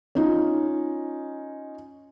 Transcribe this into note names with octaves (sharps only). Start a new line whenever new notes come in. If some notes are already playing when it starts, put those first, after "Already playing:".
C#4 D#4 F4